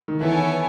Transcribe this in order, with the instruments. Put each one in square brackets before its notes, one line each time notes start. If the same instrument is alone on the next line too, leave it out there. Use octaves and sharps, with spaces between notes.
[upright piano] D#3
[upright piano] E3 [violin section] B3 E4 A4 C#5 G#5